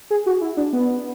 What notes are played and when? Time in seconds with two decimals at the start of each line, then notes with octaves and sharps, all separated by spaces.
0.10 G#4
0.26 F#4
0.41 E4
0.57 D4
0.73 B3